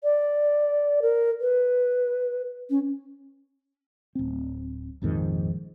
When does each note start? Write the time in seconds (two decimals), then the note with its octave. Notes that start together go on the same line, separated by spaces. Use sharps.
0.04 D5
1.02 A#4
1.41 B4
2.70 C#4
4.15 D1 C4
5.02 A#1 F2 G#2 D#3